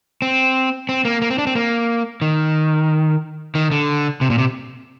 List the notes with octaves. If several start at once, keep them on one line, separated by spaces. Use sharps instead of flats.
C4
C4
A#3
A#3
C4
D4
C4
A#3
D#3
D#3
D3
C3
A#2
C3